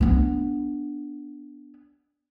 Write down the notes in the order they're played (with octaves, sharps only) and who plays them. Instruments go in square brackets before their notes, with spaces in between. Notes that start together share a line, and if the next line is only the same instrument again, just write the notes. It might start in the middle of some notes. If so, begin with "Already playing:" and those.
[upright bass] B3 D4